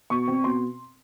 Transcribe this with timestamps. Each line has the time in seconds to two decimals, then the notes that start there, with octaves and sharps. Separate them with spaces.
0.10 B2 C#6
0.28 C4
0.44 B2 C6